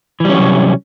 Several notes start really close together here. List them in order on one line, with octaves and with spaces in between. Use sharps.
E3 G3 C#4 F#3 C3